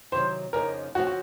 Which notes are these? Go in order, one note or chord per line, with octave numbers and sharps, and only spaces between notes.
C3 D#3 F#3 C5
F2 C#3 F3 A#3 D#4 A#4
C#3 F3 C4 F#4
F#4